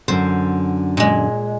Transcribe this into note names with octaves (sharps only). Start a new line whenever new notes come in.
F#2 D3 C5
A#2 G#3